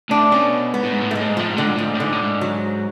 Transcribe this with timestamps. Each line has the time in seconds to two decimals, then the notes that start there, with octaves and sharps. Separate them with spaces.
0.10 A2 D4
0.32 B2 C#4
0.74 G#2 B3
0.83 A2
0.92 G#2
1.02 A2
1.11 G#2 A3
1.15 A2 G#3
1.29 G#2
1.37 A2 F3
1.47 G#2
1.57 A2 D3
1.66 G#2
1.76 A2 F3
1.86 G#2
1.95 A2
2.00 G#2 D3
2.12 A2
2.23 G#2
2.41 F#3